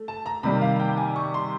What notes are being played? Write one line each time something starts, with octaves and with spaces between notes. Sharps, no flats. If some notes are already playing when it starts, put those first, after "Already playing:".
Already playing: A3
A5
A#5
C3 D#3 G3 A#3 B5
F5
G5
G#5
C#6
C6